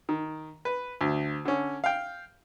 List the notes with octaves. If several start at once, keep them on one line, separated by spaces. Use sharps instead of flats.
D#3
B4
D2
D3 C#4
F5 G5